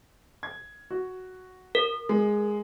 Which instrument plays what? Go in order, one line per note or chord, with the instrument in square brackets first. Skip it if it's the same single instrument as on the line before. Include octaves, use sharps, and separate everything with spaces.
[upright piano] G#6
F#4
[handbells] A#4
[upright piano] G#3